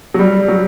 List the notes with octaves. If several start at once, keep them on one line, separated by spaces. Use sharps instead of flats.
F#3
G3
F#3